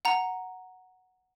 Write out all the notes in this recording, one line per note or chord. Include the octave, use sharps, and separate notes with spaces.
F#5 A#5